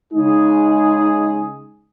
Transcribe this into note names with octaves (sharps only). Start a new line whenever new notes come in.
C#3 G#3 D#4 G#4